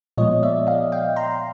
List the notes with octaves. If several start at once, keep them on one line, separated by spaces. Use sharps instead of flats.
A#2 F3 G#3 B3 C#5 D#5
D5 E5
D#5 F5
F5 G5
A#5 C6